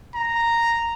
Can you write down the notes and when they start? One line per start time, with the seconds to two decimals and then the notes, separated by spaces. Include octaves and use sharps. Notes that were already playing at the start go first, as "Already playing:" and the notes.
0.15 A#5